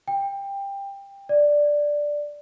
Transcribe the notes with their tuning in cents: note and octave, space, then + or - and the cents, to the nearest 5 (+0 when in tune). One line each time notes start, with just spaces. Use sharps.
G5 +20
D5 +0